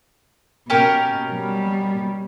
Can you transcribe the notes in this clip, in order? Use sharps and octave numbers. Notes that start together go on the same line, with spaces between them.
B2 C#4 G4 A#4
B2 G3